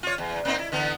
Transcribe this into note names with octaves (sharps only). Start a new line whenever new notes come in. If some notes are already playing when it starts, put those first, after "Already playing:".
F4 C#5
E2
A#3 C4 D#4
E4
D3 E3 B3